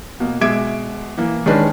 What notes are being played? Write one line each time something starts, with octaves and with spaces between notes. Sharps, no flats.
B2 A#3
B2 G#3 E5 D6 G#6 D7
E3 A#3
D#3 G#3 C#4 D4 B4